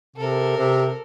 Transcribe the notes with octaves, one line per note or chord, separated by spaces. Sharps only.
C3 A4 A#4
C3